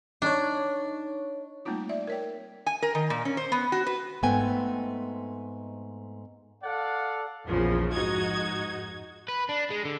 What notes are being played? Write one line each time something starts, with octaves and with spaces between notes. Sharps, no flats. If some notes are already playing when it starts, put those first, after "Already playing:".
D4 D#4 C#5
G3 A3 A#3 C4 D#4 F4
D5 E5
A#4 C#5 G5
G#5
A#4
D#3
A#2
C#4
C5
B3
F#4
B4
G#2 A3 B3 C4 G5 G#5
A4 D5 F5 F#5
A#1 E2 C#3 F3
F2 G#2 D#4 F#4 G#6
B4
D4
G#3
D3